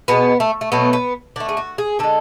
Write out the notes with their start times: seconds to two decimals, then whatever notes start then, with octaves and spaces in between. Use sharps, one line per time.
0.08 B2 G#3 B3
0.40 A3
0.61 A3
0.72 B2 F#3 A3 B3
0.93 B3
1.36 D3 A3 D4
1.49 G#4
1.57 F#4
1.78 G#4
1.99 D3 G#3 A4